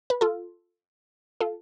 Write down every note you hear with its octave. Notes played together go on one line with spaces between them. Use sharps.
B4
F4 A4
F4 A4